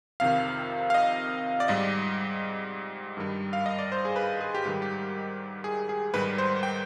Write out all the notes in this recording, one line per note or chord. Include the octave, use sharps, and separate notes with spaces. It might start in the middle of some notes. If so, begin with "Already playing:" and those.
F2 C3 D#3 F5
F5
D#5
D5
G#2 G3 D#5
G2 D#3 G3
F5
D#5
D5
C5
G#4
B4
G#4
G4
G#2 D#3 G3
G4
G#4
G#4
G#2 D#3 G3 B4
C5
G5